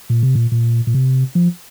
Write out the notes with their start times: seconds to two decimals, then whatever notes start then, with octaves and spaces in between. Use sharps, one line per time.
0.10 A#2
0.23 C3
0.35 A#2
0.52 A#2
0.87 A#2
0.94 C3
1.35 F3